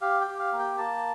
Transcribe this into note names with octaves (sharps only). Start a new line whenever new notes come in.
G4 F5
G5
G4
F5
A#3
G5
A#3 A5